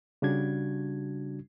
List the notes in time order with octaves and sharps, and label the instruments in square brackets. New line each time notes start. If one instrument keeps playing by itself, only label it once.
[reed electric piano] C#3 G3 D4 F#4 G#6